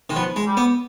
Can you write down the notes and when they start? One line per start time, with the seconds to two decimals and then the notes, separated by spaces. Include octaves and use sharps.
0.10 D#3 G#3
0.16 F3 B3
0.36 G#3
0.47 G3
0.57 B3